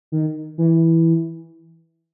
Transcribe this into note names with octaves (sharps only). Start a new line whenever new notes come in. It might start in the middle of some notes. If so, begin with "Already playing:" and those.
D#3
E3